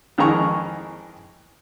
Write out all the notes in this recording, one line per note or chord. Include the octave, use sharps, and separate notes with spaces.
F2 D#3 E3 G#3 A#5 C#6